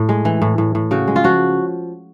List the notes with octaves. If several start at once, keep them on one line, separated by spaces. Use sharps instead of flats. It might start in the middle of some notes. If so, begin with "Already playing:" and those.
Already playing: A2
G#3
E3
A2
A2
A2
C#3 F#4
G#3
F4
F3 F#4